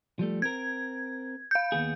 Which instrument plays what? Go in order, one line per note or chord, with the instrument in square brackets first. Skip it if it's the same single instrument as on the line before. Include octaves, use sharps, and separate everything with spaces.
[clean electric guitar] F3 G3 A3
[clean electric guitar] C4 A#4 [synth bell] G#6
[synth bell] F5 G6
[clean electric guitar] D#2 B3 G#4